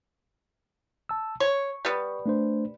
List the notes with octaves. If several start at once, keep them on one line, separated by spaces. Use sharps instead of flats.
A5 E6
C#5 C#6
G3 B3
A3 D4 C5